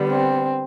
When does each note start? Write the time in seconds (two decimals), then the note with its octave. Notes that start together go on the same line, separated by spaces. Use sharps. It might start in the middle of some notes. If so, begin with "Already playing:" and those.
Already playing: D3 G3 B3
0.09 C4